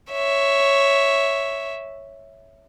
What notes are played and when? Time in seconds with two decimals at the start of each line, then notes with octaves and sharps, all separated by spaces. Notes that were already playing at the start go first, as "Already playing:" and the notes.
0.11 C#5 E5